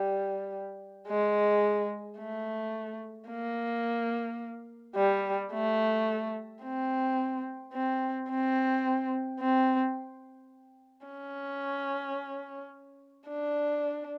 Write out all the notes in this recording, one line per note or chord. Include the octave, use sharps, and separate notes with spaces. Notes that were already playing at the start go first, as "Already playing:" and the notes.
Already playing: G3
G#3
A3
A#3
G3
A3
C4
C4
C4
C4
C#4
D4